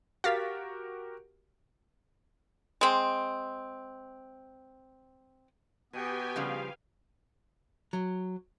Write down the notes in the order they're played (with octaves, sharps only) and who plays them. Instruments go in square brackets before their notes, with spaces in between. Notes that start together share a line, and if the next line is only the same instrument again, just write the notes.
[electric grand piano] F#4 G4 A#4 [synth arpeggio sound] F5 A6 B6
[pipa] G#3 C4
[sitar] B2 [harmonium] B3 [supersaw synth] G4 G5 G#5
[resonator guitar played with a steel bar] C#3 F3 G3 [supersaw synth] F5
[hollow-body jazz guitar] F#3